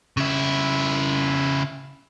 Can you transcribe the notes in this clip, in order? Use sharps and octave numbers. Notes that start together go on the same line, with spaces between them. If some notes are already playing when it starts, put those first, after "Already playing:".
C#3 E4